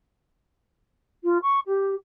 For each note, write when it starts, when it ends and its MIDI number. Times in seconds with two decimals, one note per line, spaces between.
1.24 1.38 65
1.42 1.60 85
1.67 1.95 67